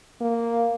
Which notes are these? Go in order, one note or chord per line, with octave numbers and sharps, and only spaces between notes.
A#3